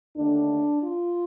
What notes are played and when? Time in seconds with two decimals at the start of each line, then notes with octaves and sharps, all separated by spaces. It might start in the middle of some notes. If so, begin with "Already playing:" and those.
0.16 D#2 D3 A3 D4
0.83 F4